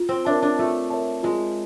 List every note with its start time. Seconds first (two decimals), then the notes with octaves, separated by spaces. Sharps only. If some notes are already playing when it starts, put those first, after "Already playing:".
Already playing: F4
0.09 C4
0.25 D4 A#4 C#5 E5 A5
0.42 D4
0.58 A3 F4
0.90 A#4 C#5 E5 A5
1.23 G#3 F4